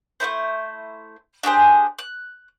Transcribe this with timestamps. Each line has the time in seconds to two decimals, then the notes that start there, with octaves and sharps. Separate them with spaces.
0.20 A3 B3 E4 C5
1.43 D4 G4 G#4 C5
1.99 F#6